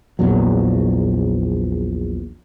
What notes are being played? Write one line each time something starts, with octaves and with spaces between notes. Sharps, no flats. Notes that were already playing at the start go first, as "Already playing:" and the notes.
A#1 E2 A#2 F#3